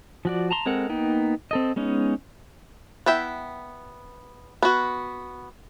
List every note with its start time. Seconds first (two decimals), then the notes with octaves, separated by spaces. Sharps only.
0.25 F3 F#4 D5
0.51 A5 A#5 C6
0.66 G#3 C4 A4 A#4 F#5
0.89 A#3 B3 D#4 G5
1.51 C4 A4 D#5
1.76 G#3 B3 C#4 D#4
3.06 B3 E4 E5 G5
4.63 B3 F#4